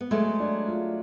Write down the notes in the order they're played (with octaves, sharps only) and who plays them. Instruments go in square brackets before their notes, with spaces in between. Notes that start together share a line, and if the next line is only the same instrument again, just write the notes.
[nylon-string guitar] B3
[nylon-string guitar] F#3 A3 [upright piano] G#3
[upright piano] D4
F4